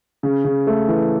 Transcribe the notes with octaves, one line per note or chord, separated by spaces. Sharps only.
C#3
C#3
A3
E3